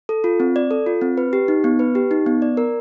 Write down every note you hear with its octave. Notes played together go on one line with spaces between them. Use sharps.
A4
F4
C4
D5
A4
F4
C4
B4
G4
D#4
B3
B4
G4
D#4
B3
D5
A#4